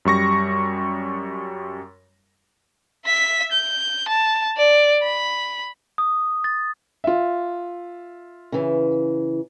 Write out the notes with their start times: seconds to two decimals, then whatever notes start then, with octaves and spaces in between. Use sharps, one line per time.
0.05 F#2 G3 C#6 A#6
3.06 E5 B6
3.52 G6
4.08 A5
4.57 D5
5.03 B5
5.98 D#6
6.44 A6
7.04 F4 E5
8.52 C#3 E3